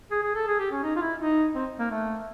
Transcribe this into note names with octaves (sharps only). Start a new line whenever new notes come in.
G#4
G#4
A4
G#4
G4
C#4
D#4
F4
E4
D#4
C4
A#3
A3